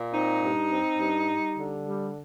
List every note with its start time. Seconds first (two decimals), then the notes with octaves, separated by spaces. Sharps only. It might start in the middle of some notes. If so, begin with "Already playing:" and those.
Already playing: A#2
0.12 C4 D#4
0.41 G2
0.70 C4
0.98 G2
1.27 G3
1.57 D3
1.85 G3